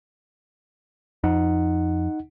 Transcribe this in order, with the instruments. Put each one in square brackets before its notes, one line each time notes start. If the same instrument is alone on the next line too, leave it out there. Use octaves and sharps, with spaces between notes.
[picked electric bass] F2 [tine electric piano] D#4 F#5